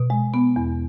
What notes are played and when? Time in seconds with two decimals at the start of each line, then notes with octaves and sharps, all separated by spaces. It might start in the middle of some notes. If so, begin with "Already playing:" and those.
Already playing: B2
0.10 G#3
0.34 B3
0.56 E2